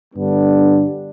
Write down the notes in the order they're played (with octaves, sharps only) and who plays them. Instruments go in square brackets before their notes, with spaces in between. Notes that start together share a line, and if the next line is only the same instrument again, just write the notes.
[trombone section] G2 D3 G3 B3 D4